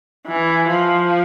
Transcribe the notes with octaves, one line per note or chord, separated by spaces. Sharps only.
E3
F3